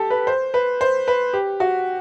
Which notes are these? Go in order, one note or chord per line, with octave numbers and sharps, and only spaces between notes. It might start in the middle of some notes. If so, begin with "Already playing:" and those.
Already playing: G4 A4
B4
C5
B4
C5
B4
G4
F#4